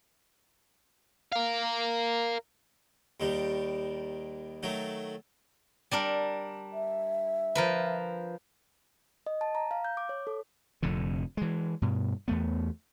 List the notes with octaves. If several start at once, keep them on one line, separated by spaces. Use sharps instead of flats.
A#4 F5
D#2 D#3 G3
D#3 F#3 A3
G3 D4 A#4
E5
F3 A#4 B4
D#5
A5
A#5
F5
G6
D6
C#5
A4
F1 F2 A2 D3
E3 G#3
G2 B2
E2 A3 B3